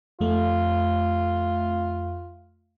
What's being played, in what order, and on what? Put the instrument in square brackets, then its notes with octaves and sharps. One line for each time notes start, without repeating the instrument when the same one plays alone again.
[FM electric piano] F2 A3 [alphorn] F4